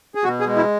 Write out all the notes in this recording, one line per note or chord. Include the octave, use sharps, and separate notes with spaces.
G#4
B2 F#4
G#4
G#3
E4